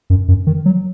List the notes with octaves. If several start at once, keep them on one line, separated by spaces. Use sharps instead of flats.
F#2
F#2
D#3
F#3